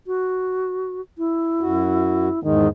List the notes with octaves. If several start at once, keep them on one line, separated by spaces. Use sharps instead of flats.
F#4
E4
F#2 F#4
E2 G#2 D#3 G#3